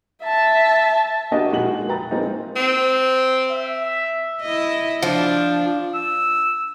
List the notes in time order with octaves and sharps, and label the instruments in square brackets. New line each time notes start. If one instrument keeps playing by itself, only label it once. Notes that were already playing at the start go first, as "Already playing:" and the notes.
[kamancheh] E5 A5
[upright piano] A#3 D4 F#4 G4 D#5
E1 A#2 G#3 D#4 F#4 F#7
B4 G5 A#5 A6
F3 G#3 A#3 C4 D#4
[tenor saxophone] C4
[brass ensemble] E5
[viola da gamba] E4 D#5
[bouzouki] F3 [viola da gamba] D4
[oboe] E6